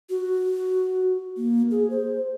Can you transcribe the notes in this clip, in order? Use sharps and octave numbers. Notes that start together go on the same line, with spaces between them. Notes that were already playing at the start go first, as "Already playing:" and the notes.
F#4
A#3
G#4
C5